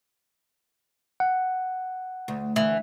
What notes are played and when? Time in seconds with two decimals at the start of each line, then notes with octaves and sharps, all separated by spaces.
1.20 F#5
2.28 D2
2.56 D2 E3